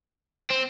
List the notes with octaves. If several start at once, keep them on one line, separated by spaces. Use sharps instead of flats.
C4